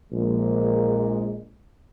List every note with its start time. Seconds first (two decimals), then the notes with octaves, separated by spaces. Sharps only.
0.13 A#1 A#2 G#3